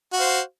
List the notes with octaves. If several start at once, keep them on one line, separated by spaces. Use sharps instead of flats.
F#4 C5 F5